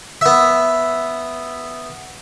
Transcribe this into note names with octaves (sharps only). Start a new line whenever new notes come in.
B3 E5